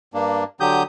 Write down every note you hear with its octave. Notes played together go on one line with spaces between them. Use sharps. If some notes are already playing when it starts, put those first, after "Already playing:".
G2 A#3 D4
D3 F#3 G4 D#6 G6